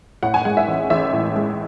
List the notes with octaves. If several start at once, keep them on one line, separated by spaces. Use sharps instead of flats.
A2 F#5
G#5
G#3 F#5
E5
A1
A1 E5
A2
G#3